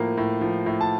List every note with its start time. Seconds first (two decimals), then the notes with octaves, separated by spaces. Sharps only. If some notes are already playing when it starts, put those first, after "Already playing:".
Already playing: A2 F3 A#3
0.17 A2
0.41 F3
0.66 A2
0.81 A5